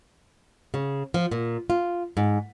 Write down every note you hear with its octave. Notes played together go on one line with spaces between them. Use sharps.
C#3
F3
A#2
F4
G#2